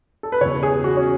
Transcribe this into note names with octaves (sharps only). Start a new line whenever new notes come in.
A4
B4
E1 E2 C#3 C#5
G#4
F#4
C#4